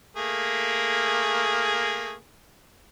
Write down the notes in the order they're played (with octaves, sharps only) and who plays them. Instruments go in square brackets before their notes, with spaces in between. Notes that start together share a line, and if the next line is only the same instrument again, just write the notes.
[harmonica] A3 A#3 G#4